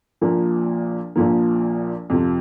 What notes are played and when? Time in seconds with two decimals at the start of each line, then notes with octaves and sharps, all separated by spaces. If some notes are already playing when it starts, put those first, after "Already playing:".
0.21 A#1 A#2 F3 A#3
1.16 A#1 A#2 F3 A#3
2.10 F2 C3 F3